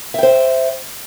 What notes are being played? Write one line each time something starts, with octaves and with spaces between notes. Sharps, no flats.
C5 E5 G5